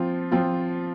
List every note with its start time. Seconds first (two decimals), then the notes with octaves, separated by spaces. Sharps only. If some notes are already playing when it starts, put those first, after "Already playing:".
Already playing: F3 C4 F4
0.31 F3 C4 F4